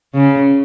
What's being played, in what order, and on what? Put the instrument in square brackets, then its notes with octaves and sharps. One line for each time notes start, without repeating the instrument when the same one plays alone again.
[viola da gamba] C#3